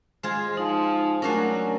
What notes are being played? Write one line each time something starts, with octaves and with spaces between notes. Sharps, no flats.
G#3 F4 G#4 C5
F3 D#4
F#3 A3 C#4 D4 F#4 A#4